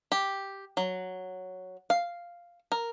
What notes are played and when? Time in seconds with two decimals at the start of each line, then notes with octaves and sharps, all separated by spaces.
0.12 G4
0.77 F#3
1.90 F5
2.72 A#4